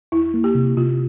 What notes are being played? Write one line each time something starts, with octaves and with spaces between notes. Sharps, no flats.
E2 E4
A#3
G4
C3
C3 F4